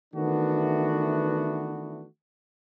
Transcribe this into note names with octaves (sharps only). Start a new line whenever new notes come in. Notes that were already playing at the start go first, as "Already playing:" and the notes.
D#3 E3 A3 B3 D4 F#4